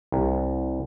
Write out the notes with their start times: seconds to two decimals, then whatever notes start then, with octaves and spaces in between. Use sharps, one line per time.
0.12 C2